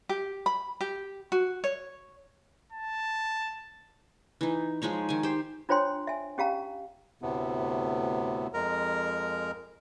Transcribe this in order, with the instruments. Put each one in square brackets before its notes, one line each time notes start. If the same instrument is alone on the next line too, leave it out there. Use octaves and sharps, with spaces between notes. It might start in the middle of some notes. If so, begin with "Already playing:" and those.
[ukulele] G4
B5
G4
F#4
C#5
[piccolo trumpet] A5
[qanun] E3 D#4
F3 G#3 D#4 C#5
D#3 G#5
G4 C5
[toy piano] D4 F4 C5 C#5 G5 C6
E5 G#5
C#4 G4 F5 A#5
[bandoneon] D2 A2 C3 B3
F2 G#3 A#4 A#5